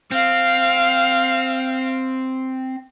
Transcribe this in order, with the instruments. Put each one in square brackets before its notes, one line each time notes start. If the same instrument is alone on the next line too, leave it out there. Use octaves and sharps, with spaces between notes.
[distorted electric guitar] C4 [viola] F5